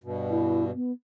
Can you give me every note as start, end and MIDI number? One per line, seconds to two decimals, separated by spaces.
0.04 0.71 43
0.04 0.71 47
0.30 0.64 64
0.75 0.92 59